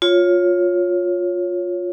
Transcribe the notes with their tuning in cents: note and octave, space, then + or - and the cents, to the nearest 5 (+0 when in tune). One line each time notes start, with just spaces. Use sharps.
F4 +15 C#5 +0